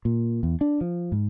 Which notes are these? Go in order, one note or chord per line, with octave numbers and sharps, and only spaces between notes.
A#2
E2
D4
F3
G#2